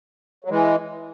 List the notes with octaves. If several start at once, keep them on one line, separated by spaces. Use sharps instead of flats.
F#3
E3 G#3